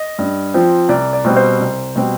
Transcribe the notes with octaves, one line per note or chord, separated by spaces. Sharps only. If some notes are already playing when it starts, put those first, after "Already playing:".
Already playing: D#5
G2
F3 C4
C2 D5
D5
B2 G3 C4
C5
C2
B2 G3 C4